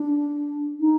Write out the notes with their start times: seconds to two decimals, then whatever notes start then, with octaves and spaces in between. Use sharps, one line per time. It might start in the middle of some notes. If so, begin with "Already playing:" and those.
Already playing: D4
0.80 D#4